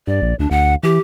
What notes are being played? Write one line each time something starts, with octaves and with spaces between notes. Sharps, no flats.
G2 D5
A#1
D2 D4
D2 F#5
E3 G4